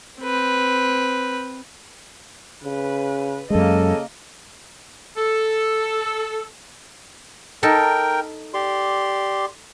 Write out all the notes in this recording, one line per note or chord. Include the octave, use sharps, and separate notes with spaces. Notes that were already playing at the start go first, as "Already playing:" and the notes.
C4 B4
C#3 B4
F#2 C#3 G#3 A#3 A4 D#5
A4
D#4 A4 A#4 G5
G4 D5 C6